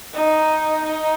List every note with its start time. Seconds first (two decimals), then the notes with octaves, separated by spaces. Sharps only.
0.14 D#4
0.86 D#4